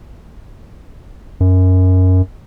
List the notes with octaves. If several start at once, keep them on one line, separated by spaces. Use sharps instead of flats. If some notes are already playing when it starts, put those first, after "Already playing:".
F#2